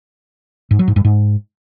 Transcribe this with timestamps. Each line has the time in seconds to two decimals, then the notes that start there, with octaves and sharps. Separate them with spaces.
0.71 G#2
0.79 F#3
0.88 G#2
0.96 G2
1.05 G#2